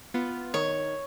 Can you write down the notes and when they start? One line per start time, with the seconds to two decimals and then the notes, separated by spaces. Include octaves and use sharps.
0.14 B3 F4
0.54 D#3 C#5